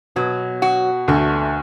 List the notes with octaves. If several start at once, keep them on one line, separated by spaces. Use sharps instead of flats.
B2 F#3
F#4
D2 D3 A3